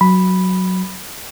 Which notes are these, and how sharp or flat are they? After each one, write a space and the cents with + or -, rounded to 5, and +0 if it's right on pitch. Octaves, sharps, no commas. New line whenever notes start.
F#3 +0 B5 +0